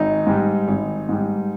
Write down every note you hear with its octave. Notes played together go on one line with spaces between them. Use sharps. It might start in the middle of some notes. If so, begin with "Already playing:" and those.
Already playing: G#1 D#4
G#2 G3
G#1
G#2 G3